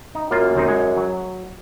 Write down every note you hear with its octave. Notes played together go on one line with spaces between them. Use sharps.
D#4
F#2 A#3 F4
D#2 C4 D#4
G#3 C#5
F#3